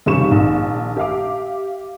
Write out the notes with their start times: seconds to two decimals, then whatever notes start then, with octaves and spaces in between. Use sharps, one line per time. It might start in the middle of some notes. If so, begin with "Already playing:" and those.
0.06 F1 C#2 D#3 G3 C#6 E7
0.28 A#1 D#3
0.97 G4 E5 F5 D6